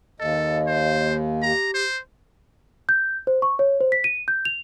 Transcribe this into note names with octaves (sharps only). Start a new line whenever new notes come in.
D#2 A4 D#5
C5
G4 A#5
C5
G6
C5
C#6
C#5
C5
B6
D#7
G6
F7